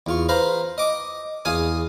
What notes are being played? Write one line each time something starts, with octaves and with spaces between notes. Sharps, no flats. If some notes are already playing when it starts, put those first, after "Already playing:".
E2 F4 C#6
B4 C5 F5 A#5 B5
D#5 D6
E2 G#4 F5 G#5 D#6